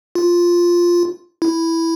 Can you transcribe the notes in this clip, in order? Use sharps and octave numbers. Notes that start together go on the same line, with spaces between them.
F4
E4